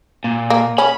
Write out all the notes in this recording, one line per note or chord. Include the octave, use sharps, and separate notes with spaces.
A#2
A#3
C#4 B5